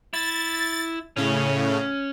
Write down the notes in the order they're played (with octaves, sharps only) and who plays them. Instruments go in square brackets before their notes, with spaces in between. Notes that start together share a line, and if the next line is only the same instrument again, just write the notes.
[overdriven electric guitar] E4 [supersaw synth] A6
[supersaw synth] A2 C#3 [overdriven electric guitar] C#4